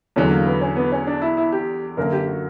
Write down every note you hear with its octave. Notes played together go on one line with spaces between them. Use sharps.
E2 D3 F#3 C#4
A#3
B3
C#4
B3
C#4
D4
E4
E4
G4
F#2 D3 A#3 A#4
G4
F#4